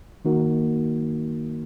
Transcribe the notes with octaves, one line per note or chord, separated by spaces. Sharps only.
D#3 A#3 D#4 F#4 A#4